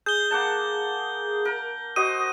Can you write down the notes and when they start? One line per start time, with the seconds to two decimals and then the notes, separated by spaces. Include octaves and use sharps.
0.06 G#4 G6 G7
0.31 A#3 F#5 A5
1.45 A#4
1.96 F#4 C5 D#5 D#6 D#7